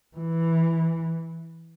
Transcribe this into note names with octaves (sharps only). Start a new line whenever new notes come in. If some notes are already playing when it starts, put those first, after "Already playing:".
E3